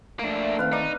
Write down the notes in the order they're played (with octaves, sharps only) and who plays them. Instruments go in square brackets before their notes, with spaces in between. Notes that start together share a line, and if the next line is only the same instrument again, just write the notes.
[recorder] A3 [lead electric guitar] A#3 D4
[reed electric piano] D5 E5
[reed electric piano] D#3 C4 [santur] B4 F5
[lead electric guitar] D#4 [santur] D5